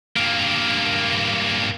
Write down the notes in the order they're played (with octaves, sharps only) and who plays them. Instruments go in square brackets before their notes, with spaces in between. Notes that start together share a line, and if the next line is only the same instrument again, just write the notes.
[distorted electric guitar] G2 A#3